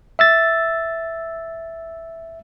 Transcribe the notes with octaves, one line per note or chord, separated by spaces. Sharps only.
E5 E6 A6